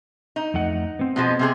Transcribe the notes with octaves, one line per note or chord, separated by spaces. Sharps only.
D#4
F2 A3 F#5
B3 C4
B2 F3 G#3
C3 G#3 G#4